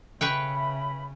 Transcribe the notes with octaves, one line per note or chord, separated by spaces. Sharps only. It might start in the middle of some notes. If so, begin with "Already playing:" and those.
C#3 B4 C#5 E5 G5 B5